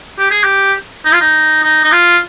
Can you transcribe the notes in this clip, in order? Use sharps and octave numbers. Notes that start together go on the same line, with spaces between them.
G4
G#4
G4
D#4
F4
D#4
D#4
D#4
F4